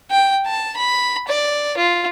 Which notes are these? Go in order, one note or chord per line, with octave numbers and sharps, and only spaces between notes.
G5
A5
B5
D5
F4